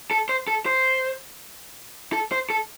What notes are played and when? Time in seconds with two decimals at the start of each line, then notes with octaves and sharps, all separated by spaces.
0.11 A4
0.29 C5
0.48 A4
0.66 C5
2.13 A4
2.32 C5
2.50 A4